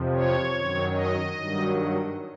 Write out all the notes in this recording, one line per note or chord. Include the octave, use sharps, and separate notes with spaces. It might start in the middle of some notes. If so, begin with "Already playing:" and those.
Already playing: F2 C3 F3
C#5
F#2 D#3 F#3
D#5
G2 D#3 F#3